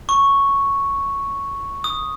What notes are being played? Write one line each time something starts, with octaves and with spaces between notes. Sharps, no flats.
C#6
D#6